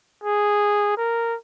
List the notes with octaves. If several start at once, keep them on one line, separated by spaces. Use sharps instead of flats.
G#4
A#4